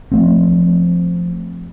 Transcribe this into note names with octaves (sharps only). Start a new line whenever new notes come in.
F3 A3 C4